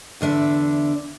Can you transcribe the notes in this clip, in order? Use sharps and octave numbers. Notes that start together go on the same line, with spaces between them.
E2 D3 D4 E5